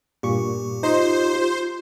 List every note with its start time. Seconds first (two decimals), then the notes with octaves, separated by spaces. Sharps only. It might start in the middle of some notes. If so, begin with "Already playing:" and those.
0.23 G2 A#2 G4 C#6
0.83 D#4 F4 C5